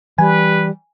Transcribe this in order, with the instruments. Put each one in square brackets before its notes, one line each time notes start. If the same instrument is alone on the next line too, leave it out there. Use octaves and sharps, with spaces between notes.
[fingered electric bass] E3 [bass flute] G3 [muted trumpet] B4 [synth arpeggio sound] G#5